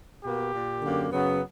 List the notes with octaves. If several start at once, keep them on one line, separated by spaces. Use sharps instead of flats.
B2 A#3 G4
A#2 A#3
F#2 D3 A#3
F#2 C#3 F#3 B3